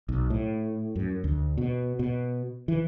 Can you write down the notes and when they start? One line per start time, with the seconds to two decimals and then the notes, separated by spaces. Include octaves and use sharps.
0.09 B1
0.30 A2
0.96 F#2
1.24 D2
1.58 B2
1.99 B2
2.68 E3